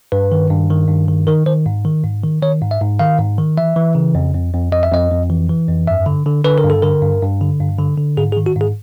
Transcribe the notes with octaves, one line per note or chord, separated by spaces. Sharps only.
G2 B4
D#3
G2
D#3
G2
D#3
D#3 A#4
D#3 C5
G#2
D#3
G#2
D#3
D#3 C#5
G#2
E5
G#2
D#3 F5
G#2
D#3
E3 E5
E3
C#3
F2
F2
F2
F2 D#5
E5
F2 D#5
F2
E3
E3
F2
G2 E5
D3
D3
D3 B4
A#4
G2
A4
D3 A#4
G2
G2
D3
G2
D3
D3
G#2 G#4
G#4
D#3
F#4
G#2
G#4